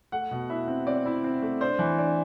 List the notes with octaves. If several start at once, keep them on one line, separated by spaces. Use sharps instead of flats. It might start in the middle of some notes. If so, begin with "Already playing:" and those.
A3 F#5
B2
E4 E5
C4
C4 D5
E4
C4
A3
D4 C5
E3
D4